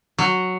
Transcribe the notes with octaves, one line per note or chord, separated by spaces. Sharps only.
F#3